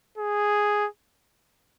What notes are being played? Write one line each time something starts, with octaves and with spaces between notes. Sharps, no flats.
G#4